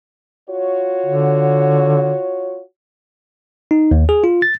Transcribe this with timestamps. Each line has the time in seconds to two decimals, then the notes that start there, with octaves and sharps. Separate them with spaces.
0.49 F4 F#4 C#5
1.06 D3
3.71 D#4
3.91 D#2
4.09 G#4
4.24 F4
4.42 A6